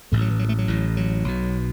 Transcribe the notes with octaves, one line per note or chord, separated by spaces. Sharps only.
A1 A2 A3
F#3
E3
F#3
A3
F#3
A1 A2
F#3
B1 B2